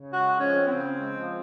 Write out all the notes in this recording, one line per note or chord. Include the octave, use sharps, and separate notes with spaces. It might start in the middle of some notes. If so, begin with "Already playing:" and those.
Already playing: C#3
G#3 F#4
F3
C#4
C4
C4
C#3
G#3
F3